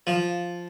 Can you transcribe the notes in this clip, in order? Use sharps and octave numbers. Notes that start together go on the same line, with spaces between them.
F3